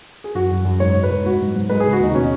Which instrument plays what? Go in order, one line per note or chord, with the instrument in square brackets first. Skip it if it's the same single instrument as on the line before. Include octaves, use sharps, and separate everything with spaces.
[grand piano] G#4
F#2 F#4
F#2
F#2
G#2 C#5
G#2
B4
G#2
G#2 F#4
F#3
G#2
G#3 B4
C#3 G#4
F#4
D#2 D#4
B2 C#4